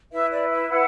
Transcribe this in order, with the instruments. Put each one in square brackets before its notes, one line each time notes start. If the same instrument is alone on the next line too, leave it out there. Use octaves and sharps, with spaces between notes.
[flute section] E4 B4 E5
D5
E5
F#5